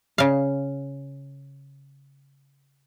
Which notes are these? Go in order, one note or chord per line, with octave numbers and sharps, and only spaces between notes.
C#3 F5